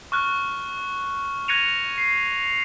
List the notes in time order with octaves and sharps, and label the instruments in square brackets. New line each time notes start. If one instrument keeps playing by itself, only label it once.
[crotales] C#6 F6 F#6
F#6 G#6 A#6 C#7 D#7 F7
C7